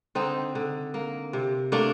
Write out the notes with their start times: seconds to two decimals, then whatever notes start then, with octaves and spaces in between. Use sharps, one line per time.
0.15 D3 C4 D#4
0.55 D3
0.94 A#3
1.33 C3
1.72 A3 A#3 D4